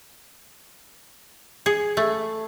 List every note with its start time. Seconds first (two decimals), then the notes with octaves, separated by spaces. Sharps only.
1.66 G#4
1.97 A3